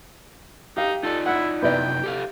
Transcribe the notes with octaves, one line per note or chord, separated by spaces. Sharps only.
D#4 G4 F5
D#4 F4 A4 D5
E4 F#5
F#2 C3 B3 D#4 E4 D5 G5
G4 A4 F5